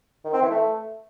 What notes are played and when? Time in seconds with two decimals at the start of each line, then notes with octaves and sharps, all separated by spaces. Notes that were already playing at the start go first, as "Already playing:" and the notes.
0.24 D#3
0.33 C4
0.42 E3
0.51 A3